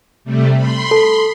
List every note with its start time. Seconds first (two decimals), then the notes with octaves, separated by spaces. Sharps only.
0.24 C3 G3 A3
0.56 B5 C6
0.91 A4